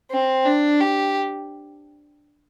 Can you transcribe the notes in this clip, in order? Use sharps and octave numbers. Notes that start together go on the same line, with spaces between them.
C4
D4
G4